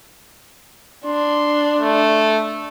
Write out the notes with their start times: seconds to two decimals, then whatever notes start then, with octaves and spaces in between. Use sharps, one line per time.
1.05 D4 C6
1.79 A3